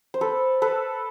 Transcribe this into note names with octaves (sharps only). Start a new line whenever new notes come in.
C5
A4 B4
A4 B4